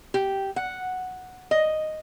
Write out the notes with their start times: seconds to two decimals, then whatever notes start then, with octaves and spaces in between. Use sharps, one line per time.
0.14 G4
0.56 F#5
1.51 D#5